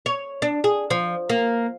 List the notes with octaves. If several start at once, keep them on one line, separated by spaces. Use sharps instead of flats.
C#5
D4
G#4
F3
A#3